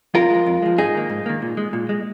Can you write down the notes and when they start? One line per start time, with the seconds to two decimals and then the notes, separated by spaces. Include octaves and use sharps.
0.14 F2 F4 A#4
0.30 F3 G#3
0.46 F2
0.62 F3 G#3
0.78 G#2 D#4 G#4
0.95 D#3 A#3
1.10 G#2
1.26 D#3 A#3
1.42 A#2
1.57 G#3
1.73 A#2
1.89 G#3